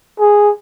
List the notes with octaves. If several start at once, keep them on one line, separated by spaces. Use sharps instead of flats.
G#4